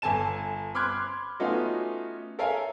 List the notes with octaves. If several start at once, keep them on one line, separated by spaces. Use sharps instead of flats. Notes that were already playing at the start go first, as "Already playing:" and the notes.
G1 A4 G#5 A5 E7
B5 C6 D6 F6 F#6 G#6
A3 B3 C#4 D#4 F4 F#4
A4 A#4 C#5 E5 F5 G#5